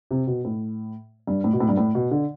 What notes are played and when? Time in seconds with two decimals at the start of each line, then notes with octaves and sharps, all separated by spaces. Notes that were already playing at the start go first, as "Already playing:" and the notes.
0.11 C3
0.27 B2
0.45 A2
1.27 G2
1.44 A2
1.53 B2
1.60 A2
1.69 G2
1.77 A2
1.95 B2
2.11 D3